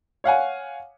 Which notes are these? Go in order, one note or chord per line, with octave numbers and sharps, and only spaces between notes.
C#5 F5 F#5 G#5